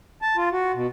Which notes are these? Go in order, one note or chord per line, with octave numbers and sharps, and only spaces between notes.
A5
F4
F#4
B2